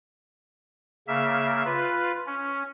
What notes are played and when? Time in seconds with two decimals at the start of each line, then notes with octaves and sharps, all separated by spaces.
1.08 C#3 A#3 E5
1.65 F4 B4
2.27 C#4